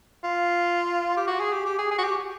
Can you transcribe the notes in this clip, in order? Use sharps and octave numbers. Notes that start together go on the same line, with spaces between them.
F4
G4
F#4
G#4
G4
G4
G#4
G#4
F#4
G4